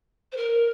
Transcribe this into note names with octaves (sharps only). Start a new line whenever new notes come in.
C5
A#4